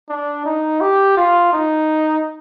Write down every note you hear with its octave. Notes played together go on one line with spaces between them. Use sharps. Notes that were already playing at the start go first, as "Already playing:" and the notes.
D4
D#4
G4
F4
D#4